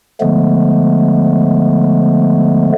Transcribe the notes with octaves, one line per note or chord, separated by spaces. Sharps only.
D3 F3 G#3 A3 B3